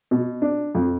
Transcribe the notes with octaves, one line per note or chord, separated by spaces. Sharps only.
B2
D4
F2